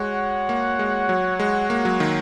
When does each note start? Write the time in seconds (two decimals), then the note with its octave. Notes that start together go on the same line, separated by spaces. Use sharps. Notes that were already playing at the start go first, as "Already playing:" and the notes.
Already playing: G#3 F#4 C#5 F#5
0.49 A#3
0.79 G#3
1.09 F#3
1.39 G#3
1.70 A#3
1.85 F#3
2.00 D#3